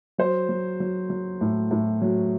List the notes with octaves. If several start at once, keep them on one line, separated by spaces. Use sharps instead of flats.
F#3 C5
F#3
F#3
F#3
A2
A2
F#3